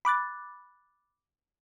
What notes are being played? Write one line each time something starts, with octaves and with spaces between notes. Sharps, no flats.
B5 D6 F#6 A6